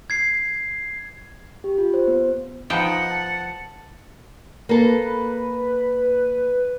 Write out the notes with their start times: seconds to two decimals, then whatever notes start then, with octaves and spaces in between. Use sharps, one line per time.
0.10 G#6 C7
1.64 G4
1.78 F4
1.94 C5
2.08 B3
2.70 F3 B3 D#4 F#5 G5
3.08 A5
4.69 A#3 A4 B4